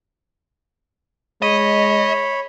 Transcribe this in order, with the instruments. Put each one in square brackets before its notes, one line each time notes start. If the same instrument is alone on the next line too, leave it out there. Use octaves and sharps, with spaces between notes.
[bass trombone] G#3 [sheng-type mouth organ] C#5 B5 [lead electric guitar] D#5